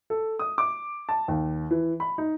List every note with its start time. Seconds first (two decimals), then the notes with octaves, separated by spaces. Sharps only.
0.10 A4
0.39 D#6
0.58 D6
1.09 A5
1.28 D#2
1.71 E3
2.00 B5
2.18 D#4